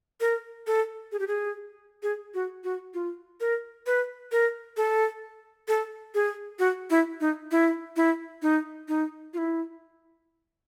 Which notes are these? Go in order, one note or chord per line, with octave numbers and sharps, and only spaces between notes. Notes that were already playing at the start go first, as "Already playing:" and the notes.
A#4
A4
G#4
G4
G#4
G#4
F#4
F#4
F4
A#4
B4
A#4
A4
A4
G#4
F#4
E4
D#4
E4
E4
D#4
D#4
F4
E4